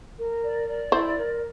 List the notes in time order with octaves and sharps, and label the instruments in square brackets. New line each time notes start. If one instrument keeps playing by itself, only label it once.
[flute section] A#4
D5
D5
[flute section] E4 [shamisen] C5
[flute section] A#4